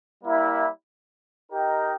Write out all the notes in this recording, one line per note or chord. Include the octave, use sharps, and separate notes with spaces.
G3 A#3 E4
D#4 G4 A#4 D#5 G5